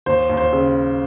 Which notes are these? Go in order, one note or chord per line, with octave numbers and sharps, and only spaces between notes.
D#2 C5
D#2
C5
C#3